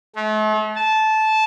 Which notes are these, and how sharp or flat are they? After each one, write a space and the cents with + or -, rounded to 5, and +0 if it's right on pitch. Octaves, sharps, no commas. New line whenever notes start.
A3 -40
A5 -15